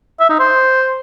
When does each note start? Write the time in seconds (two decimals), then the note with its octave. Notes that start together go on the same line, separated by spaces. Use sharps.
0.20 E5
0.29 D#4
0.39 C5